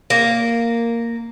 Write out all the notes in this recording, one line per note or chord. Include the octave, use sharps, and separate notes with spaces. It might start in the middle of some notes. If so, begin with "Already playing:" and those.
A#3